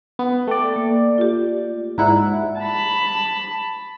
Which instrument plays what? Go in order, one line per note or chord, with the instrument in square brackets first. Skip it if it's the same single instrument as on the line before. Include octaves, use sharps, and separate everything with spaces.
[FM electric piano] B3
[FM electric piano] A3 D5 [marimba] G5
[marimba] A#3
F4 G4
[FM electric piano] G#2 E4 F#5 [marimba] D5 E5 A#5
[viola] A5 B5